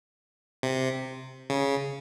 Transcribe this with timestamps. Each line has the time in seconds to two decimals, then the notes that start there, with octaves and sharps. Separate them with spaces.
0.63 C3
1.50 C#3